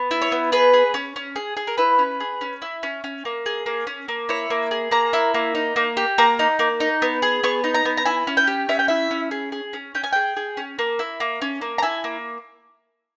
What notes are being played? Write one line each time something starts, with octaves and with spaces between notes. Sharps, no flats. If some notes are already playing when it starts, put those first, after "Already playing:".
Already playing: B3
E4
C#5
B3
G#4 B4
G#4
C#4
C#4
G#4
G#4
A#4
E4 B4
C#4
G#4
C#4
E4
C#4
C#4
A#3
G#4
A#3
C#4
A#3
E4 C#5
A#3
G#4
A#3 A#5
E4
A#3
D#4
A#3
G4
A#3 A#5
D#4
A#3
D#4
B3
G#4
B3 C#6
D#4
A#5
B3
A#5
E4 G#5
C#4
G5
G4
C#4 E5
G5
E4 E5
C#4
G#4
G#4
C#4
C#4 G5
G#5
G#4 G5
G#4
C#4
A#3
E4
A#3
C#4
A#3
A#5
E4 G#5
A#3